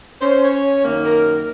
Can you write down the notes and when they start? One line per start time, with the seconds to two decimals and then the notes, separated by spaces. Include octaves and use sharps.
0.21 C#4 C5
0.44 C#5
0.85 F#2 D#3 A#3
1.05 A#4